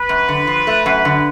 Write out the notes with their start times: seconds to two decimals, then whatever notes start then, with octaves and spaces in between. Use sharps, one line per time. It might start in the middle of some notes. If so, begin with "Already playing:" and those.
Already playing: B4
0.09 F#2
0.28 D3
0.47 F3
0.67 A3
0.86 F#2
1.05 D3